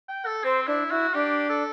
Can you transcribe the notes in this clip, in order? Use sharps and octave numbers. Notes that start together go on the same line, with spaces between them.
G5
A4
C4 C5
D4 E4
E4 F#4
D4 G4
A4